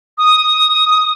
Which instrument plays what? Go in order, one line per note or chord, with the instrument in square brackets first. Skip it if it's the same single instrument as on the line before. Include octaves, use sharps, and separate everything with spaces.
[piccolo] D#6